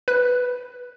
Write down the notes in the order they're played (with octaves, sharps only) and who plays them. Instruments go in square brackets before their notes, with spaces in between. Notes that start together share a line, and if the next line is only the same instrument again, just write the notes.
[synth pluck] B4 F#6